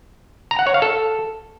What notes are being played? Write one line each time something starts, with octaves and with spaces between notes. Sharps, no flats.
A#5
F#5
C#5
F5
A4